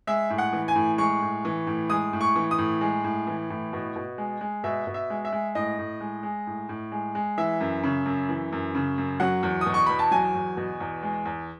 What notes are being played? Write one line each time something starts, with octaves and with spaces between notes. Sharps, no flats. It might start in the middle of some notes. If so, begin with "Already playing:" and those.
G#3 E5
A2
F#5
E3
G#5
A2
G#3 C#6
A2
E3
A2
G#3 D#6
A2
C#6
E3
D#6
A2
G#3
A2
E3
A2
B2
B2
G#3
G#3
B2 E5
B2
E5
G#3
E5
G#3
A2 D#5
A2
G#3
G#3
A2
A2
G#3
G#3
E3 E5
F#2
C#3
F#2
E3
F#2
C#3
F#2
F#3 F#5
E2
D#6
B2
C#6
E2 B5
A5
F#3 G#5
E2
B2
E2
G#3
E2